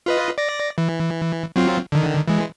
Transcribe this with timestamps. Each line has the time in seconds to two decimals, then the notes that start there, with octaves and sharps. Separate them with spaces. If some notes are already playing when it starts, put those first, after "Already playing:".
0.06 F4 B4 D#5
0.38 D5 A#6
0.78 E3
1.56 F#3 C4 F4
1.92 D3 D#3
2.28 E3 G#3